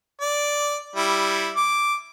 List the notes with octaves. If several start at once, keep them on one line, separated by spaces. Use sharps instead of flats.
D5
G3 E4
D6